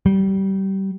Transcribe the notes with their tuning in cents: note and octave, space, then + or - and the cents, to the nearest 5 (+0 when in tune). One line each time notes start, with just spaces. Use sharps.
G3 -25